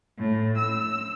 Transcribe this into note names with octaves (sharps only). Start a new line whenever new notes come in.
A2
E6